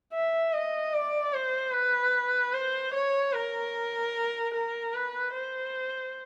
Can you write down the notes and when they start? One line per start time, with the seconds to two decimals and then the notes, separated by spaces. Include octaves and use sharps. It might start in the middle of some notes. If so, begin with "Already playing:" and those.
0.13 E5
0.53 D#5
0.93 D5
1.34 C5
1.74 B4
2.54 C5
2.94 C#5
3.33 A#4
4.54 A#4
4.94 B4
5.34 C5